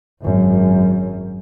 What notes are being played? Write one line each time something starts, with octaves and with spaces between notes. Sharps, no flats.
G#1 F#2